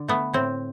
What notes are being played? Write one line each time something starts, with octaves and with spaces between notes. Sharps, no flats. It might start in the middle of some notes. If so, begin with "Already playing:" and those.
Already playing: D3
A3 B3
A2 C4